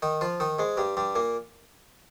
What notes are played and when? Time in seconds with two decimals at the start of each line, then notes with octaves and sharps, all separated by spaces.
0.02 D#3 D#4
0.21 F3 F4
0.40 D#3 D#4
0.59 G#2 G#3
0.77 G2 G3
0.97 G2 G3
1.15 A#2 A#3